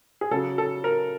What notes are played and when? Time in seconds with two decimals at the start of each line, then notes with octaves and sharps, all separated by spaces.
0.21 G#4
0.31 C#3 F#3 A4
0.58 A4
0.84 A#4